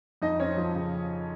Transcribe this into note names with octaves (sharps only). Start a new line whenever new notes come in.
F2 D#4 D#5
C4 C#4 C#5
F3
C#3